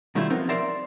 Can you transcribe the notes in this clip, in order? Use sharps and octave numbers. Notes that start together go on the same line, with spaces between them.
B2 D#3 G3 A3 E4 F4
F3 B3 C4 D#4 A#4
A#4 C5 D5 E5 A#5